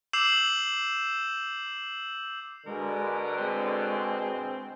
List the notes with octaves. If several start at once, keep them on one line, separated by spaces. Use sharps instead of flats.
D6 E6 G6 C7 E7 F#7
B2 D3 G#3 A#4
G#3 C4